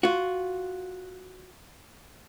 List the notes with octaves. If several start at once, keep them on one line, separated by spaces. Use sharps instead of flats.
F4 F#4